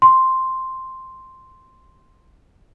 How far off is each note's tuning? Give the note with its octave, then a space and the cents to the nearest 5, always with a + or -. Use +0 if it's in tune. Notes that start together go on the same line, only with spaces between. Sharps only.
C6 +0